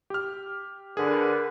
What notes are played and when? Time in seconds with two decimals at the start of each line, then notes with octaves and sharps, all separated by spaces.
0.10 G4 F6
0.97 D3 G#4 A#4 B4